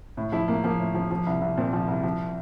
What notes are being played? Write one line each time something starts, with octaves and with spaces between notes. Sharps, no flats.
A2
F3 E4
A2 A#3
F3 A#3
A2
F3
F3
C2
C2
A#2 C4
F3
C2
F3